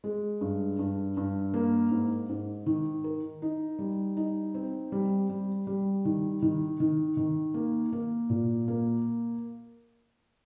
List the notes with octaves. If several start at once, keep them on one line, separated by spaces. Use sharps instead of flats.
G#3
G2
G2
G2
A#3
G#2
G#2
D#3
A#4
D#4
G3
D#4
C4
G3
G3
G3
D#3
D#3
D#3
D#3
A#3
A#3
A#2
A#3